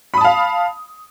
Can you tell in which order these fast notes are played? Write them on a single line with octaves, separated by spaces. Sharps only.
B5 D#6 A5 F5